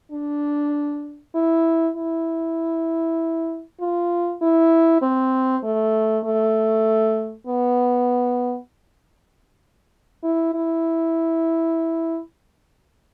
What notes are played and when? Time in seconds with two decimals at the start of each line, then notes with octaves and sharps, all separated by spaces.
0.12 D4
1.35 E4
1.97 E4
3.80 F4
4.42 E4
5.02 C4
5.64 A3
6.24 A3
7.47 B3
10.23 E4
10.54 E4